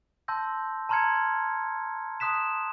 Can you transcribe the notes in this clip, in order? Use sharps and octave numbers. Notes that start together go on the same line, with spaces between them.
A5 C6 E6 G6 A#6
A5 A#5 C6 F6 G#6 C#7
A5 C6 D#6 F#6 B6 E7